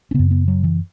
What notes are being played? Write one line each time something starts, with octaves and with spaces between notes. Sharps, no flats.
C#4
F#2 C#3 B3
B3
F#3
E3